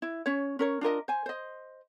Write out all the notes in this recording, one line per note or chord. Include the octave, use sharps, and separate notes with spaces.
E4
C#4 C#5
C#4 A#4 C#5
D4 F4 A#4 D#5
C5 G#5
C5 D#5